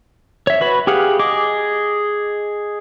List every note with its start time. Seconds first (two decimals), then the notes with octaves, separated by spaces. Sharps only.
0.47 C#5 E5
0.61 F#4 B4 B5
0.87 G4 G#4 F5 F#5
1.19 G#4 D#5 D6